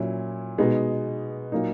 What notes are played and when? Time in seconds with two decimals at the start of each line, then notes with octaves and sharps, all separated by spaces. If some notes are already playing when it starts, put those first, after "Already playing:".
Already playing: A#2 F#3 C#4 E4
0.58 B2 G#3 B3 D#4
1.52 A#2 F#3 A#3 D#4